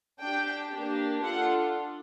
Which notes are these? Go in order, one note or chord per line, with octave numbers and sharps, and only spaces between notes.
D4 G4 G5
A#3 D4 G4
D4 F4 A4 F#5